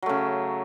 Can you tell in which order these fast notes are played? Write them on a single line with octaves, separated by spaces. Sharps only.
F#3 A3 C#3